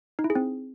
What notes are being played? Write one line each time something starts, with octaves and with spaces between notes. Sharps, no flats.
D#4
E4
G#4
C4